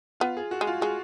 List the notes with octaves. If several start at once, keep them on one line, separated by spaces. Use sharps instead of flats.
B3 F4
G#4
F#4
G#3
F4
G#3 F#4